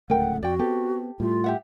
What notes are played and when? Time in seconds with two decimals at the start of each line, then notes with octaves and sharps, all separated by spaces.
0.10 D1 C#2 A3 A#4 F#5 G5
0.43 F2 F#4 D5 G5
0.59 B3 C4 G4 A4
1.20 A2 G3 A3 F4
1.44 G4 E5 F#5